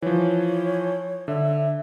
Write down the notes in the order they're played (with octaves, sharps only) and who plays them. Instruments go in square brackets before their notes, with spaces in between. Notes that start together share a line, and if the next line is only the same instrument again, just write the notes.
[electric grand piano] E3 F3 [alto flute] C#5
[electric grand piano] D3 [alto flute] E5